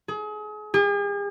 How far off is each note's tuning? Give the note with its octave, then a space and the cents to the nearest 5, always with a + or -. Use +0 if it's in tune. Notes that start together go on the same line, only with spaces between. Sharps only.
G#4 +35
G#4 -45